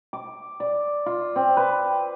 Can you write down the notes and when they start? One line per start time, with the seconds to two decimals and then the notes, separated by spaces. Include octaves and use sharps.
0.13 D6
0.60 D5
1.06 F4
1.36 C4
1.57 B4